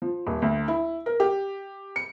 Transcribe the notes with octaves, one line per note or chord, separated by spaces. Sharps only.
F3
D#1
D2
E4
A#4
G4
C#7